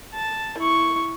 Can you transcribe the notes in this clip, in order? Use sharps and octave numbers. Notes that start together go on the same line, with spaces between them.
A5
E4 C#6